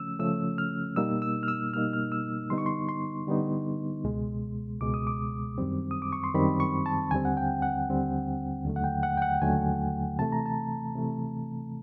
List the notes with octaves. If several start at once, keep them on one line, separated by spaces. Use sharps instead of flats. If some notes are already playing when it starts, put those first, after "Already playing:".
Already playing: C#3 F3 A3 C#4 E6
C#3 F3 A3 C#4 E6
F6
B2 G3 A#3 D#4 E6
E6
F6
E6
B2 G3 A#3 D#4 F6
F6
E6
D3 G3 B3 D#4 C6
C#6
C6
C6
D3 G3 B3 D#4
C#2 B2 G#3
C#2 B2 G#3 D6
D#6
D6
F#2 D#3 G3 C4
D#6
D6
C#6
C6
F#2 D#3 G3 C4 B5
C#6
A5
D#2 D3 G3 C4 G#5
F#5
G5
F#5
D#2 D3 G3 C4
D#2 D3 F#3 A3
F#5
G5
F#5
G5
F#5
D#2 D3 F#3 A3 G#5
C3 E3 A3 A5
A#5
A5
C3 E3 A3